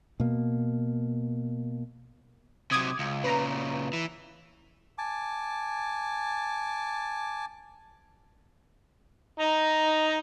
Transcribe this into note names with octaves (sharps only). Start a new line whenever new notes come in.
B2 A#3
C3 F#3 D6 D#6 G#6
C#2
A#2 C#3 B4 A#5
E3
G#5 A5 D6
D#4 A#5